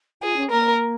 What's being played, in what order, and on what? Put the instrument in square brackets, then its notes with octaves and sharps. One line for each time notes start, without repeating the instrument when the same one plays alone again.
[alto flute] F4 [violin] G#4
[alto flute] C#4
[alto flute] A#3 [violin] A#4